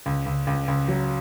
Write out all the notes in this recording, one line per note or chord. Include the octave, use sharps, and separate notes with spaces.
C#2
C#2
C#2
C#2
F#3